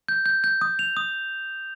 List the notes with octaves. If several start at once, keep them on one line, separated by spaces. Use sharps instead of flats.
G6
G6
G6
D#6
F7
D#6